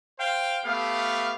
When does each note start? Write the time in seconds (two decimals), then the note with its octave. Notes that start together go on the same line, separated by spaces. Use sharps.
0.19 C5 F5 G5
0.65 A3 B3 G4 F5